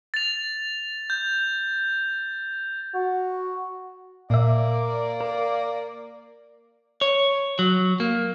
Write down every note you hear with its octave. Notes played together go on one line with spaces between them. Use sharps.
A6 F7
G6
F#4
A#2 A#3 D5 E5
A#4
C#5
F#3
A#3